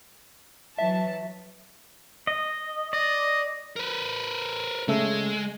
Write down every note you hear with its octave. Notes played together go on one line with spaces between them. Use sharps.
E3 F#3 E5 A5
D#5
D5 D#5
A#4 B4
C#3 G#3 A3 E6